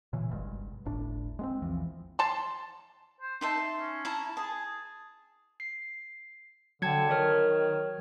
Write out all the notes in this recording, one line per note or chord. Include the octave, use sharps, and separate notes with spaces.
A#2 C#3 E3
F#1 B1 G2 G#3
D1 G1 A2 D4
G#3 B3 C4
A#1 E2 E3 F3
A5 C6
C5
D#4 E5 A5 C6
C#4
E4 A5 A#5
G#4 A5
C7
D3 F#3 G5 A5 G#6 C#7
D#3 A#4 C#5 F6